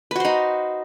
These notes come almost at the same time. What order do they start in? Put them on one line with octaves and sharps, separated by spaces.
B4 F#4 C5 D#4